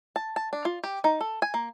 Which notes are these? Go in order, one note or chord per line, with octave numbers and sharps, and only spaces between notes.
A5
A5
D4
F4
G4
D#4
A4
G#5
A#3